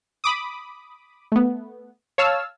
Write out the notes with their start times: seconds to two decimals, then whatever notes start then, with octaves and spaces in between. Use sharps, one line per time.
0.24 B5 D6 D#6
1.32 A3 B3
2.18 C#5 F5 A5 E6 F6